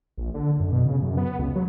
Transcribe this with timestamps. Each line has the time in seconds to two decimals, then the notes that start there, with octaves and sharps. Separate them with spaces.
0.18 A#1
0.34 D3
0.60 F#2
0.72 B2
0.85 C#3
1.02 F#2
1.17 B3
1.39 C#2
1.55 F#3